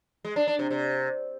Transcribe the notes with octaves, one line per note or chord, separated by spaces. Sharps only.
G#3
D4
D4
C3
C3